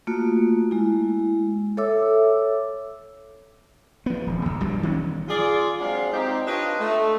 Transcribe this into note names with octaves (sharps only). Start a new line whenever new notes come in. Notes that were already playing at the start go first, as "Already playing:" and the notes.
A3 A#3 F4 F#4
G#3 E4
A4 C#5 E5 D6 E6
F3 B3
D#1
C#2
A#1 G2 B2 G3
D#3 F#3 C#4
F4 G#4 D5
F#3 G#3 C4 D4 F5
C4 D#4 G4
D4 F4 G4 B4 C#5 D#5
A3